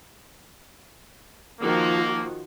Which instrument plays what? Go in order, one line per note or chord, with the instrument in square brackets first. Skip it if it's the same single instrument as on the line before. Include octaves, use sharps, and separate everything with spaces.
[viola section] D#3 F3 F#4 [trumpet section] A#3